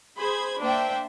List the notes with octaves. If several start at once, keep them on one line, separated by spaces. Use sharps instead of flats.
G#4 C5 B5 G#6
A#3 D4 C5 D5 E5 G5